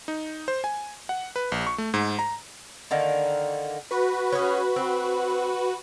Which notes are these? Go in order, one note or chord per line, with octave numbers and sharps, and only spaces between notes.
D#4
C5
G#5
F#5
B4
A#1
C#6
A3
G#2
A#5
D3 D#3 A#3
F#4 B4
C#4 G#4
C4